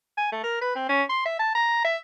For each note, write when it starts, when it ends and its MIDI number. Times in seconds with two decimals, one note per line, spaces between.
0.17 0.30 80
0.32 0.42 57
0.43 0.57 70
0.61 0.72 71
0.75 0.84 60
0.89 1.03 61
1.09 1.23 84
1.25 1.37 76
1.39 1.50 81
1.55 1.84 82
1.84 1.97 76